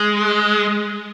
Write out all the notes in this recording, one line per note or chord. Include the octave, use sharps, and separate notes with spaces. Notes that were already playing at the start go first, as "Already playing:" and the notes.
Already playing: G#3